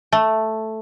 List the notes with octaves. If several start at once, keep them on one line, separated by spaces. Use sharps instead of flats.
A3